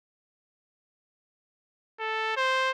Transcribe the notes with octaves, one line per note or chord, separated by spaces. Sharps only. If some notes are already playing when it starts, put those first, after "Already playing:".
A4
C5